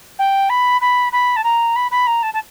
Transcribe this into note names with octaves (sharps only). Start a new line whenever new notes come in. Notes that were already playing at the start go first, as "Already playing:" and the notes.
G5
B5
B5
B5
A5
A#5
B5
B5
A#5
A5
A5